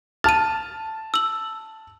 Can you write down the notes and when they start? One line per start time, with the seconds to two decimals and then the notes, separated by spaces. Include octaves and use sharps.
0.24 A5 F6 A6 D#7
1.14 E6 F#7